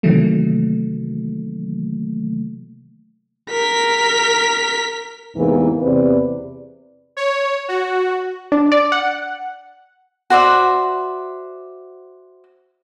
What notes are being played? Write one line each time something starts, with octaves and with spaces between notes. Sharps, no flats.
C3 D#3 E3 F#3 A3 A#3
A#4 B6
E2 G#2 C3 E3 A#3
E2 C3 C4 B4 D5
C#5
F#4
D4
D5
F#5
F#4 C5 D5 E5